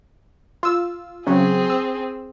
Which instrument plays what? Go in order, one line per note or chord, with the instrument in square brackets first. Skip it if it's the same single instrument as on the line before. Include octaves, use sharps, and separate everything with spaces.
[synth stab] F4 E6
[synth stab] C#3 F#3 C#4 [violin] C4 G#4
[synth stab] E6